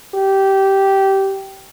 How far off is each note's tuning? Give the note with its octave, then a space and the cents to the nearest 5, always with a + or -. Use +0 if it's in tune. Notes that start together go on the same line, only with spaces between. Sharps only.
G4 -15